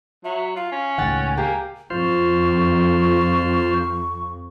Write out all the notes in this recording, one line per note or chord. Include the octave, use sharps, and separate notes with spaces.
F#3 E5
F4 F5
C#4
C#2 A2 D#3 F#5 G5 A6
A#3 G4 G#5
F2 F4 C5 C#6